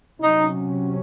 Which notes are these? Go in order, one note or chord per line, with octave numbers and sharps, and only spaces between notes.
C3 F#3 C#4 D#4